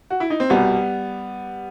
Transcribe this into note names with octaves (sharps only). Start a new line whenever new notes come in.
F#4
E4
D#4
C4
C2 B2 G3 B3